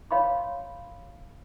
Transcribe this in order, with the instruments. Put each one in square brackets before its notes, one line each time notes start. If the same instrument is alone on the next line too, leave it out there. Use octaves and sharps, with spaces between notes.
[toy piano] C#5 F5 B5 C6